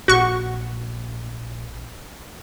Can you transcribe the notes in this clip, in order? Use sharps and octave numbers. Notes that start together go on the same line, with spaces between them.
A#1 F#4 C#6